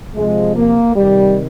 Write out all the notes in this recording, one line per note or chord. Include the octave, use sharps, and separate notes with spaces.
C3 F3 G#3
A#3
C3 D#3 G3